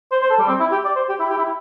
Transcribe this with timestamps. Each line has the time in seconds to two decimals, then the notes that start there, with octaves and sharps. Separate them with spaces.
0.11 C5
0.22 C5
0.30 A4
0.39 G3
0.48 C4
0.60 E4
0.72 G4
0.85 D5
0.96 C5
1.09 G4
1.20 E4
1.29 G4
1.38 E4